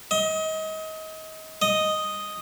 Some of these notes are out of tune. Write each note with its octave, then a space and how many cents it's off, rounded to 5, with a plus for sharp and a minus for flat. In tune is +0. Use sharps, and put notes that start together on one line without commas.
D#5 +30
D#5 +0